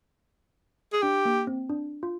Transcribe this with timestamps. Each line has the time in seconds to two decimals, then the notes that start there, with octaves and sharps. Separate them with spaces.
0.93 G#4
1.02 D4 G4
1.25 A#3
1.47 C4
1.70 D4
2.03 F4